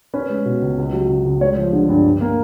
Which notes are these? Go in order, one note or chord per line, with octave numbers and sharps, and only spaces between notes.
C#4 B4
G#3
B2
C#2
C#2
F#3
C#3
C#2
G#3 C#5
F3
D3
G2
D4
A#3